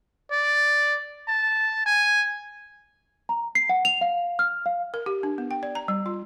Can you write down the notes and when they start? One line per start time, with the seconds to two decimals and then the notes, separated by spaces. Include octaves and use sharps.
0.31 D5
1.28 A5
1.86 G#5
3.29 A#5
3.55 C7
3.69 F#5
3.85 F7
4.01 F5
4.39 F6
4.66 F5
4.94 A#4
5.06 G4
5.23 D4
5.38 B3
5.51 G5
5.63 D5
5.75 A#5
5.88 G3
6.06 F4